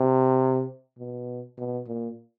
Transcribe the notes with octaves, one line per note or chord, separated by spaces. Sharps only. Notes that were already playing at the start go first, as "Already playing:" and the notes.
Already playing: C3
B2
B2
A#2